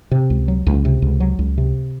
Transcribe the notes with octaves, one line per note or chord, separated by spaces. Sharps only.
C3
C#2
F#3
C#2
C3
C#2
F#3
C#2
C3